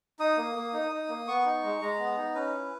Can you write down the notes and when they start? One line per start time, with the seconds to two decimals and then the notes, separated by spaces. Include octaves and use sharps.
0.19 D#4 D#6
0.37 A#3
0.56 A#3
0.73 D#4
0.92 D#4
1.09 A#3
1.28 B3 C#6
1.45 D#4
1.63 G#3
1.81 G#3 A#5
1.99 B3
2.17 D#4
2.35 C#4 B4
2.53 E4